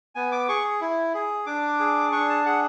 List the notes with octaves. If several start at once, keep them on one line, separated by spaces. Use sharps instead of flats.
B3 G#5
D6
G#4 C#6
E4
G#4
D4 D6
G#4
D4 C#6
A5
G#4 F#5